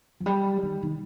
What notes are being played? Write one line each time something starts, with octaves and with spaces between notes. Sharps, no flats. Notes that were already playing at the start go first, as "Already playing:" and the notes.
F3
G3
D#3
D#3